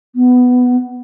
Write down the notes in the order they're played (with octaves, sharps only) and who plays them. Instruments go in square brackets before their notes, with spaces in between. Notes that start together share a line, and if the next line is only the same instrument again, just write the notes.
[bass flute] B3